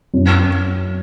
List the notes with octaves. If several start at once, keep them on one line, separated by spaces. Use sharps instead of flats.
F#2